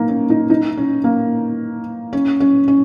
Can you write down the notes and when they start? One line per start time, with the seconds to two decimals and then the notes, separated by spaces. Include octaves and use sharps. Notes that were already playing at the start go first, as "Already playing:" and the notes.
Already playing: A#3 D#4
0.09 C#4
0.30 D#4
0.50 D#4
0.77 C#4
1.04 A#3
2.13 C#4
2.40 C#4
2.68 C#4